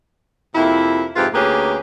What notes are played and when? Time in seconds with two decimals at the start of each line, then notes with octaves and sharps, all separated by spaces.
0.55 F2 C3 A#3 E4
1.16 F2 G#2 C3 F4 G4 B4
1.33 D2 A#3 C#4 G4 G#4 B4